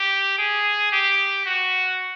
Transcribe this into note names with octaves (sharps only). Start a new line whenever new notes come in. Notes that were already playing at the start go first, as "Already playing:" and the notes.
Already playing: G4
G#4
G4
F#4